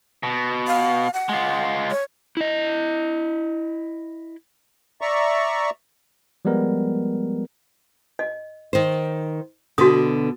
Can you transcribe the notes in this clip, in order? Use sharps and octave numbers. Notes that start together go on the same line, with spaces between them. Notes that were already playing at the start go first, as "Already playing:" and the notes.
B2
F5
F#5
G#3 F4
C#5
E4 D#5
D5 E5 A#5 C#6
F3 G3 G#3 B3 A#4
D#5
D#3 C5
B2 D3 B3 F#4 D#6